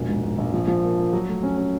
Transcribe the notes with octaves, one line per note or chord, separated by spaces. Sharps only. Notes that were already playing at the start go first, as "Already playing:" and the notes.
Already playing: E1 A#1
G#2
G#2
A#1
F3
F3
A#3
A#3
F#3
A3
C#4
C#4